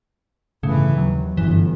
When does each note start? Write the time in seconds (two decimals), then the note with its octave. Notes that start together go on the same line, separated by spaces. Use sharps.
0.63 G1 A2 C#3 E3
0.98 D#2 F#3
1.37 G1 F#2 E3